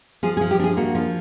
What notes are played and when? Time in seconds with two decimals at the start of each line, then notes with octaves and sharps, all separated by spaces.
0.23 F3 G#4
0.37 G#4
0.41 F3
0.51 G4
0.59 D4 G#4
0.77 A#3 F#4
0.95 F3